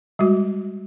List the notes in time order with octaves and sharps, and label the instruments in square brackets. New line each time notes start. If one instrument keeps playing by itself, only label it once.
[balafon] G3 G#3 F#4